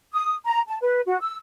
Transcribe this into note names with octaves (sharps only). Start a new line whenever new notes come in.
D#6
A#5
A5
B4
F#4
E6